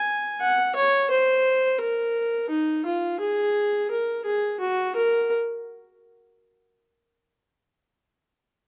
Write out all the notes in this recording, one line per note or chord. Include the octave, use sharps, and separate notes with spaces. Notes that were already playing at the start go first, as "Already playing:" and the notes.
Already playing: G#5
F#5
C#5
C5
A#4
D#4
F4
G#4
A#4
G#4
F#4
A#4